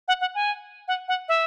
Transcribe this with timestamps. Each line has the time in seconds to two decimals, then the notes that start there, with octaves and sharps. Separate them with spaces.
0.08 F#5
0.21 F#5
0.35 G#5
0.88 F#5
1.08 F#5
1.28 E5